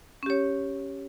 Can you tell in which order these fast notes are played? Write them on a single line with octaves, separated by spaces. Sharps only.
C#4 G4 C#5